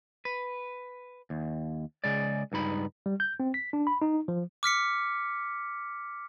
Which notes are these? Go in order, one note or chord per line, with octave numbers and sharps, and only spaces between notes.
B4
D#2
C#3 G#3 D5
C#2 G2 D#4 B5
G3
G6
C4
B6
D4
B5
D#4
F3
D6 F6 B6 C#7